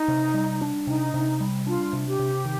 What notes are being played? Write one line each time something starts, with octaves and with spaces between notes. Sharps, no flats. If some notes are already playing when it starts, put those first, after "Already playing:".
Already playing: D#4
C3
G3
D4
C3 D#4
C3
G3
D4 F4
C3
G4
C3
D#3